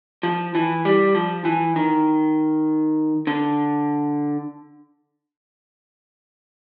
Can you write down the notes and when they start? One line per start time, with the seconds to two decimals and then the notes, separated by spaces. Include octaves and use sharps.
0.23 F3
0.55 E3
0.85 G3
1.15 F3
1.45 E3
1.76 D#3
3.27 D3